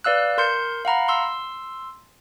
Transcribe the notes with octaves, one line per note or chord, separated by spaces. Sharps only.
B4 D5 F5 E6 F#6
A#4 C6 G6 C#7
F5 F#5 A#5 B5
C6 E6